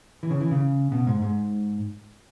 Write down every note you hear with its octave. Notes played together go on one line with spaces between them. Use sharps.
E3
C#3
E3
C#3
B2
G#2
G#2